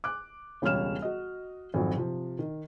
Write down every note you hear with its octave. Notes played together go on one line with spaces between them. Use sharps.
D6 F#6
E1 C#2 G3 C#5 F6 E7
F#4 D#5
G#1 F2 F#3
C3 F3
D#3